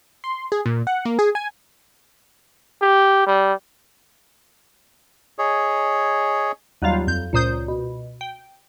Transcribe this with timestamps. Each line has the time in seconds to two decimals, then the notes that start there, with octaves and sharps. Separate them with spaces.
0.24 C6
0.52 G#4
0.66 A#2
0.87 F#5
1.05 A#3
1.19 G#4
1.35 G#5
2.81 G4
3.27 G3
5.38 G#4 C#5 D#5
6.82 D#2 F#3 G3 F4 F5
7.07 F2 G6
7.33 C#2 A#2 C5 D#6 G6
7.68 B2
8.21 G5